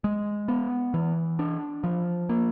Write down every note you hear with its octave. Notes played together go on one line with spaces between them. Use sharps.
G#3
B3
E3
D4
F3
A#3